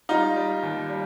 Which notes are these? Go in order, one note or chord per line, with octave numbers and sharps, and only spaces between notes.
G3 D#4 F4
G3
D#2
G3